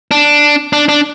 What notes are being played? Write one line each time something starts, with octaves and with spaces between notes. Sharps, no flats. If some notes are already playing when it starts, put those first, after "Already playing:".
D4
D4
D4